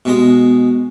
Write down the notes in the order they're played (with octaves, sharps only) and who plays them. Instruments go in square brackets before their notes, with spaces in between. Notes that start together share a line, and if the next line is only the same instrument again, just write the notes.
[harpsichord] B2 G#3